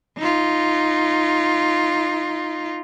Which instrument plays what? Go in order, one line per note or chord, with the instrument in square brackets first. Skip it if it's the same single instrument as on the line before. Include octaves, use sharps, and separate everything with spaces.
[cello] D#4 F4